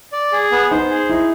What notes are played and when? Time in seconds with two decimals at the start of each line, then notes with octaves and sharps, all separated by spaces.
0.12 D5
0.32 G#4
0.52 B3
0.71 D#4 C5
0.90 G#4
1.09 D#4 E4